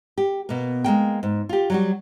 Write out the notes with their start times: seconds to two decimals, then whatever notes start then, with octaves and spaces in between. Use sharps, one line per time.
0.18 G4
0.49 B2 A#3
0.84 G#3 A#3 G5
1.23 G#2
1.49 F4 G4
1.70 F#3 G3 F#4